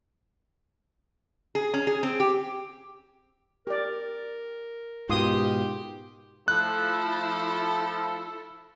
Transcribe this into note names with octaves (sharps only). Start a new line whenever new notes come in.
G#4
C#4
G#4
C4
G4
G4 A#4 D5
G#2 B2 F4 G4 C6 D#6
F3 A3 E4 A4 F#6